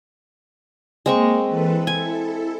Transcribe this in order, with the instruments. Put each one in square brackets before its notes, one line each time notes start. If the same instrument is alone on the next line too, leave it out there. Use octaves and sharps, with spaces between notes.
[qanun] G#3 C4 C#6 [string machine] A#3
[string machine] E3 A4 B4
[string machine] E4 A4 [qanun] G#5